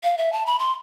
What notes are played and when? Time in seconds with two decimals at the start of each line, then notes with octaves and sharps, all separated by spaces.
0.03 F5
0.18 E5
0.33 A5
0.46 B5
0.59 C6